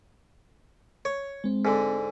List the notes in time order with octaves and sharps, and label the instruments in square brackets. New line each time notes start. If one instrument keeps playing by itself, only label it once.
[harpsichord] C#5
[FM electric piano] G#3 C4
[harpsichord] G#2 D3